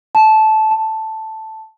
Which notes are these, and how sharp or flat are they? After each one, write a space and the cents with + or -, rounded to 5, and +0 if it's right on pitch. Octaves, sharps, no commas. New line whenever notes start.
A5 -15
A5 +0